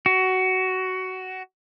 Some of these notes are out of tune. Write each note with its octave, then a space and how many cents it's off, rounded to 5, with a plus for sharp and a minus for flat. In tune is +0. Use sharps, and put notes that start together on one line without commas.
F#4 +15